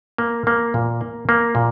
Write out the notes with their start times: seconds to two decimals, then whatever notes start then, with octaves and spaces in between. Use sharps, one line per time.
0.18 A#3
0.47 A#3
0.74 A#2
1.01 A#3
1.29 A#3
1.55 A#2